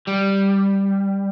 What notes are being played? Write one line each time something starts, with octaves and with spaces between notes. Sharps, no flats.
G3